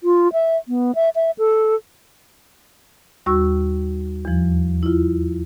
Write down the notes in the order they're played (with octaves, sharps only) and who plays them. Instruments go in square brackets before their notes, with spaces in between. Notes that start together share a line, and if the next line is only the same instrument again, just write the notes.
[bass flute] F4
E5
B3
E5
E5
A4
[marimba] D#2 G3 F#4 C#6 E6
E2 F3
E4 F4